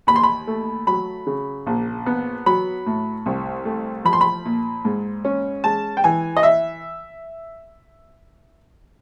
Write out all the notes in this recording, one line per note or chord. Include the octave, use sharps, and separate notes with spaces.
D#2 B5
C6
B5
A3
F#3 B5
C#3
A#1
B3
F#3 B5
A2
C2
A3
F3 B5
C6
B5
A#2
G#2
C#4
G#3 A5
G5
E3 G#5
D#5
E5